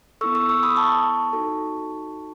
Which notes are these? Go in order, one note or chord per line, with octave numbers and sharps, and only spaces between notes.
B3 E4 A4 C#6 E6
C#6 E6
C#6 E6
B5 D#6
A5 C#6
D#4 F#4 A4